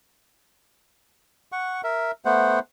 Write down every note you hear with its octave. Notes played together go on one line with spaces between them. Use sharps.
F#5 C#6
A#4 E5
A3 B3 C5 F#5